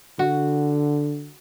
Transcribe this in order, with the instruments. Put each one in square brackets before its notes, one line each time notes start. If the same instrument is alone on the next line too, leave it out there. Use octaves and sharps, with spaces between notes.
[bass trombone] D3 [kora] F#4